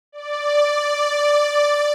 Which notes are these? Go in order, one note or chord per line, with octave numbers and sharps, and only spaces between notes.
D5
D5